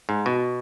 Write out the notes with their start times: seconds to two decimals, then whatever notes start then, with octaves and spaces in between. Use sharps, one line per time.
0.09 G#2
0.26 B2